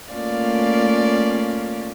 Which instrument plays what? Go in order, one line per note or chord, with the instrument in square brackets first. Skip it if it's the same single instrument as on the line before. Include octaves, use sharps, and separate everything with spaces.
[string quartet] A3 A#3 C#4 F4 D5 F5